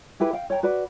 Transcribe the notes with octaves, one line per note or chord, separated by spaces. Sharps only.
E4 G4 G#4 B4
F5 G5
C#5 G5 A#5
F#4 B4 D5